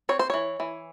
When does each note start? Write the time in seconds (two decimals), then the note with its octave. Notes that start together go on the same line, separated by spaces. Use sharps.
0.09 C4 C#5
0.19 C5
0.30 E3 C#5
0.60 E3